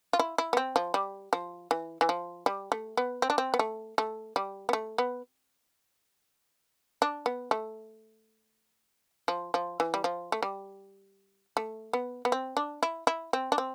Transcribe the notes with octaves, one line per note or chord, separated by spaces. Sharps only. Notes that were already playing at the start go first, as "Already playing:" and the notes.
F4
E4
E4
B3
C4
F3
G3
F3
E3
E3
F3
G3
A3
B3
C4
D4
C4
B3
A3
A3
G3
B3
A3
B3
D4
B3
A3
F3
F3
E3
G3
F3
A3
G3
A3
B3
B3
C4
D4
E4
E4
C4
D4
C4